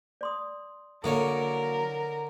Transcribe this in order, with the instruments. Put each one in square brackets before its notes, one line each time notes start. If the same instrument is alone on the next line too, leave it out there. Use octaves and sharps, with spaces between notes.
[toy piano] D5 C6 D#6
[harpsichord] D3 C#5 [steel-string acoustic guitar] F#3 A#3 [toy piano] A4 D#5 [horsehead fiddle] A#4